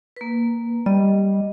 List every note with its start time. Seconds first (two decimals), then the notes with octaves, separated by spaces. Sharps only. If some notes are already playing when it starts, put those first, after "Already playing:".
0.17 A#3 B4
0.86 G3 D#5